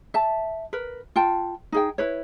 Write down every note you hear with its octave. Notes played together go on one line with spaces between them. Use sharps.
E5 A5
A#4 B4
F4 G5 A5
D#4 G#4 G5
E4 B4 C#5